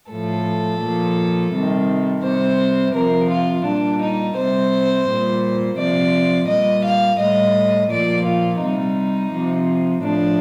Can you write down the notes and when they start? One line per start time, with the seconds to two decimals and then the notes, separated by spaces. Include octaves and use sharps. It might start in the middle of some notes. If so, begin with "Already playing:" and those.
0.11 A2 F3 A4
0.81 A#2 F3
1.53 C3 D#3 G3
2.23 C3 G3 C5
2.94 C3 F3 A#4
3.29 F4
3.65 A#2 G3 D4
4.01 D#4
4.36 C3 G3 C5
5.07 A#2 G3
5.78 C3 F3 D5
6.48 A#2 G3 D#5
6.84 F5
7.19 A2 G3 D#5
7.91 A#2 F3 D5
8.25 F4
8.61 C3 G3 D#4
9.33 C3 F3
10.03 A2 F3 D4